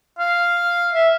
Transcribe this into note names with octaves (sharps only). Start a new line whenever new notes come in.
F5
E5